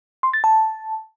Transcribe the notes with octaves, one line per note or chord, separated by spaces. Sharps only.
C6
A6
A5